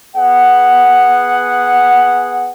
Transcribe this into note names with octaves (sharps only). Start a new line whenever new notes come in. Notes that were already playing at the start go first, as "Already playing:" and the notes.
B3 G#4 F#5